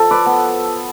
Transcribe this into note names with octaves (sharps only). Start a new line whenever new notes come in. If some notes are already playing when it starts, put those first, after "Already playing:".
Already playing: F3 A4
B4 D5
B3